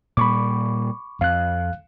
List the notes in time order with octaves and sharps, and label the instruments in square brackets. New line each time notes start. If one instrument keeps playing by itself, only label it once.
[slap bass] A#2 G3 [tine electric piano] B5 C#6 D6
[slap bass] F2 [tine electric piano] F5 F#6